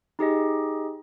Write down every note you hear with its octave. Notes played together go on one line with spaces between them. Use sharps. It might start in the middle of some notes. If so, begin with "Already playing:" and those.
D#4 G4 G#4 D#5